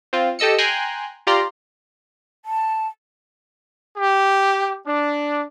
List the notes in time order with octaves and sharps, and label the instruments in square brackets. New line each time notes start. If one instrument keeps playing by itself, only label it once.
[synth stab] C4 F4
G4 A4 D#5 E6 C#7
G5 G#5 A#5 C6 F#6
F4 G4 D5 A#5 C6
[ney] A5
[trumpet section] G4
D4